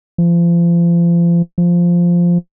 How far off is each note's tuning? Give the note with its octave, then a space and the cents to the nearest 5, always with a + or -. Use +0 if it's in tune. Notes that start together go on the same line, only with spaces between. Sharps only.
F3 -35
F3 -5